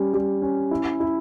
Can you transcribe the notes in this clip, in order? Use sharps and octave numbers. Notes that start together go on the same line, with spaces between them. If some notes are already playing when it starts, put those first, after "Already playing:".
Already playing: G3 C#4
G3
C#4
E4
E4